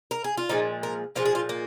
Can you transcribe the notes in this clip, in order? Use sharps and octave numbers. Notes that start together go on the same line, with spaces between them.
A#4
G#4
F4
A#2 F3 G#3 D#4
A#4
A#2 F3 G#3 F4
G#4
F4
A#3